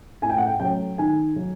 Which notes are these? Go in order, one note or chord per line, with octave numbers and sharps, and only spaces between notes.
A2 G#5
G5
F#5
G5
F#3 A3 C#4 G5
D#3 G#5
F#3